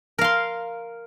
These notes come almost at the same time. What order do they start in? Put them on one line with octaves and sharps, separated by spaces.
A#4 F5 C6